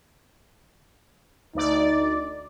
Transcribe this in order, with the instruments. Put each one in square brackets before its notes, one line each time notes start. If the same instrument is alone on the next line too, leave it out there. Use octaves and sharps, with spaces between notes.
[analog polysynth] D2 D5 [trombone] D#4